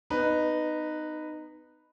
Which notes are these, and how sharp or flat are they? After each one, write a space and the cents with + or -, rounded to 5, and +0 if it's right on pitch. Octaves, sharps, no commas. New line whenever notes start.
B3 +35 D#4 -15 B4 +0